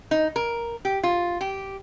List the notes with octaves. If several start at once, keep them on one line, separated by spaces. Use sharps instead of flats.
D#4
A#4
G4
F4
G4